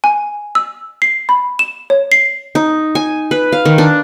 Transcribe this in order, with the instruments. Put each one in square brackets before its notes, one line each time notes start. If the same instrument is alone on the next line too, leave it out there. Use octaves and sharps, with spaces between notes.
[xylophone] G#5
E6
C7
B5
E7
C#5
C7
[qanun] D#4
G#5
B4
F5
D#3
D4